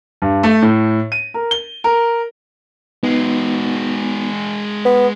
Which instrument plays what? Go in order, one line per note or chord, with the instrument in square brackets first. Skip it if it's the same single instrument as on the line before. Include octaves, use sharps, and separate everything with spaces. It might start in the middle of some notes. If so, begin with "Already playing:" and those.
[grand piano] G2
A3
A2
D#7
A#4
G7
A#4
[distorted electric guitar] G#3 F#4 [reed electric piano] B3 D#4
[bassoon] B3